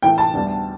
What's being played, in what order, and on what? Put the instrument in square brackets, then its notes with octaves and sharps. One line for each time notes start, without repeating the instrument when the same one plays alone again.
[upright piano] A2 E3 A3 G5
A5
D2 D3 G3 B3